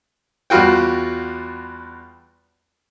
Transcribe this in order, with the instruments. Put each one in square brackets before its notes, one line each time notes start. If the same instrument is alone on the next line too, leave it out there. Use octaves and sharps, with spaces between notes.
[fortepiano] E2 G3 F4 F#4 G5